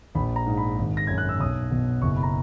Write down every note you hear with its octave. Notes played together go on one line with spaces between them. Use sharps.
A#1 B5
A#5
G#2
B5
G#1
A#6
F#2 G#6
F#6
E6
B1 D#6
B2
F#1 C#6
B5
A#5